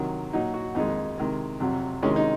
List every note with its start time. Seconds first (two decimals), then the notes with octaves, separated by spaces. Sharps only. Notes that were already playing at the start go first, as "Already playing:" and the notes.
Already playing: C3 D#3 F#3
0.33 A#2 F#3 D#4
0.54 F#4
0.75 F2 D#3 G#3 D#4
1.18 C3 D#3 G#3
1.60 F2 C3 F#3
2.03 C3 D#3 G#3 C#4
2.16 D#4